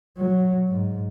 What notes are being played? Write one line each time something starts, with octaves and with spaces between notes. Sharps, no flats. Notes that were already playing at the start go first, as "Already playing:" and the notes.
F#3
G#2